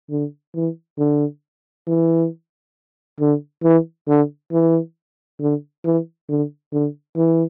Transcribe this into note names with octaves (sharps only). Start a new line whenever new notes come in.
D3
E3
D3
E3
D3
E3
D3
E3
D3
E3
D3
D3
E3